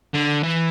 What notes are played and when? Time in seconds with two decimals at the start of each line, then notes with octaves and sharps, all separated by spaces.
0.14 D3
0.43 E3